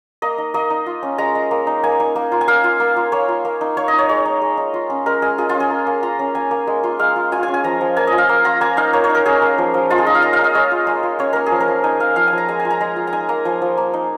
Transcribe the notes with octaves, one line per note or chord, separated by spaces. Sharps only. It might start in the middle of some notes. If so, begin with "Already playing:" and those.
A#3 D#5
D#4
A#3 D#5
D#4
F4
C#4
G#3 A#5
G#3
A#3
D#4
A#3 G#5
D#4
A#3
F4
G#5
A#3 F5
F4
A#3
F4
A#3 C#5
F4
A#3
D#4
A#3 C#5
D#5
D#4
C#5
G#3 C#5
D#4
G#3
D#4
F4
C#4
G#3 A#4
G#3 G#4
F4 G#4
F4
C#4
G#4
A#3
A#3
F4 A#5
C#4
A#3 G#5
A#3
G#3
F4
G#3 F5
F4
F4 G#5
G#5
C#4
G#5
F3 A#5
F3
A#3 G#5
D#5
F4
F5
A#3
F4 A#5
A#3 G#5
D#4 F5
A#3 C#5
C#5
D#4
A#4
C#4 G#4
A#3
F3
F3
G#3 F4
G#4
D#4 D#5
F5
G#3 A#5
F5
D#4
D#5
G#3 C#5
F4
G#3
F4
C#4 C#5
A#3 A#4
G#4
F3
A#4
F3
D#4 G#5
A#3 F5
F3 F5
G#5
F3
A#5
G#3 G#5
G#5
F4
A#5
G#3 A#5
F4
A#5
D#4 G#5
A#3 A#5
F3 G#5
F3
A#3
D#4